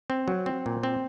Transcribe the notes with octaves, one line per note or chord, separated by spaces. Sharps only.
C4
F#3
C4
A#2
C4